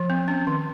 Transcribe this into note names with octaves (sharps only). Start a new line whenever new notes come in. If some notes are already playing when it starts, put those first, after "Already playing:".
Already playing: F3
C4
C#4
D#3